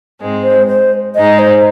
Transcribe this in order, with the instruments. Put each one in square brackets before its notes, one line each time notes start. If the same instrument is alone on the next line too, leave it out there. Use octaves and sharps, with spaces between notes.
[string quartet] G#2 G#3 C4
[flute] C5
C5
[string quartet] G#2 G#3 D#4 [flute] D#5
[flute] C5